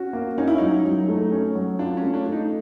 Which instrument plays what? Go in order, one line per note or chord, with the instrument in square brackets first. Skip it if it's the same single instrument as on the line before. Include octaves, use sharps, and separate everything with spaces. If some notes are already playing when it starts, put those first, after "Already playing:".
Already playing: [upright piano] C#4 F#4
A#3
[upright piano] C#4 [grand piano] D#4
[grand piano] E4
[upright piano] F#3 [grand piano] D#4
[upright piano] F#3
A3
C#4
F#3
[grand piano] D4 [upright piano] F4
[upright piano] A3 [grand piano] C#4
[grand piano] D4
[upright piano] A3
[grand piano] D#4